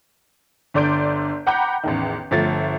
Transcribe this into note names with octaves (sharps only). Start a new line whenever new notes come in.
G1 D3 D5 C6 G6 D7
F#5 G5 A#5 B5 D6 G6
A1 E2 D#3
G1 F3 A3 A6